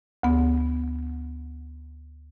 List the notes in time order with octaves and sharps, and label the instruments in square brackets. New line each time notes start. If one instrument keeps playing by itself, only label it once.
[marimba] D2 B3